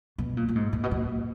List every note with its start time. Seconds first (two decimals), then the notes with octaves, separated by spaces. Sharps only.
0.18 B2
0.37 A#2
0.49 A#2
0.55 G#2
0.73 A#2
0.83 B2
0.91 A#2